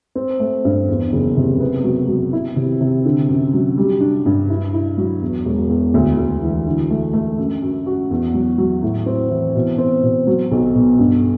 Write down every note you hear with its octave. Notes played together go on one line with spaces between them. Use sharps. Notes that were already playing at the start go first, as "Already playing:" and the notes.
C4
A3
G2
E2
F#1
C3
B3
F#3
F#3
E4
C3
C3
D3
F#2
F#3
G3
D4
G2
E4
E4
F#3
E2
E1
E2
D2
D2
E3
D3
A3
A3
F#2
F#2
F#4
E2
F#3
F#3
A2
C4
E3
B2
C4
B2
F#3
B1
B2
G2